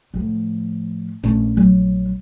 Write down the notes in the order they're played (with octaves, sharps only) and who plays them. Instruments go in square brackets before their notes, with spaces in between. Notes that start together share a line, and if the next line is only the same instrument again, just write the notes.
[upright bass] A2 F3
[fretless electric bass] A#1 A#2 A3 [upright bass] C#4
[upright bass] F#3